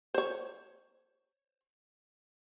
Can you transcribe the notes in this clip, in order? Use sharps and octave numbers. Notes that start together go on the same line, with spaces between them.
C5 C#5